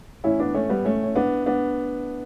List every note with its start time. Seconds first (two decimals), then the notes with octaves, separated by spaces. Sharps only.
0.24 A2 E3 C#4 E4
0.39 B3 D4
0.54 A3 C#4
0.70 G3 B3
0.85 A3 C#4
1.04 C#4
1.16 B3 D4
1.46 B3 D4